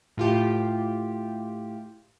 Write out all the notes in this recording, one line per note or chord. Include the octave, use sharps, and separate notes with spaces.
A2 F4 G4